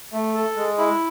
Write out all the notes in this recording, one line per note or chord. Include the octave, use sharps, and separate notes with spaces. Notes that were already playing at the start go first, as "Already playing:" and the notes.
A3
A4
G#3
E4